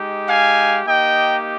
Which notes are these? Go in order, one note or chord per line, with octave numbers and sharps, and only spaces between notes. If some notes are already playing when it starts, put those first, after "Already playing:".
Already playing: G#3 D#4 G4
F5 G#5
A#3 D#4 G4 D#5 G5